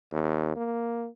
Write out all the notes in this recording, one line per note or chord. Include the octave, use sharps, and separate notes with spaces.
D#2
A#3